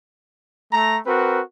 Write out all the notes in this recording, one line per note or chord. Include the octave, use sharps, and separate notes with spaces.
A3 A#5
C4 F#4 A#4 B4